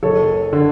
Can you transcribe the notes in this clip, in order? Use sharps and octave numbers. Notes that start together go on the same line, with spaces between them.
F#1 A4 C#5
D3